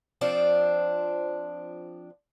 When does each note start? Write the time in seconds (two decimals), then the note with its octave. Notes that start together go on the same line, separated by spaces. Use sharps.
0.21 F3 C4 D4